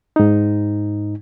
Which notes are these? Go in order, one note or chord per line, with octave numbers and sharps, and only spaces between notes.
G#2 D#4